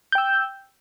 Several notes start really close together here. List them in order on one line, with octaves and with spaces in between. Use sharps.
G6 G5 E6